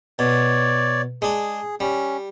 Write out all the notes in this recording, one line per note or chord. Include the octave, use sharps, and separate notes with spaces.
B2 C#5 D5
G#3 D4 G#4
G3 C#4